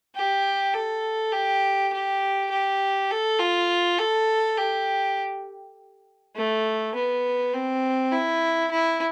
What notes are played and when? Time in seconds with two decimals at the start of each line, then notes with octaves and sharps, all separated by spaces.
0.15 G4
0.73 A4
1.32 G4
1.93 G4
2.51 G4
3.11 A4
3.39 F4
3.99 A4
4.57 G4
6.35 A3
6.95 B3
7.53 C4
8.12 E4
8.71 E4